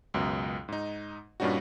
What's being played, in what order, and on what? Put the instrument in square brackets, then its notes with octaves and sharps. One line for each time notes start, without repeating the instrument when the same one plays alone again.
[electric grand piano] C#2 F#2 B2
G#2 D#4
G2 A#2 G3 C#4 D#4 F#4